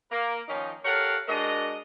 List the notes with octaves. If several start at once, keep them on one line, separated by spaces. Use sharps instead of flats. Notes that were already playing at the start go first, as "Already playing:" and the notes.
A#3 A#4
D#3 F3 C#4 D#4
G4 A4 A#4 C#5 F5 F#5
G#3 D4 F#4 A#4 D#5